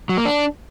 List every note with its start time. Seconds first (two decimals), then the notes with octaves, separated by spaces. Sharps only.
0.09 F#3
0.17 A#3
0.25 D4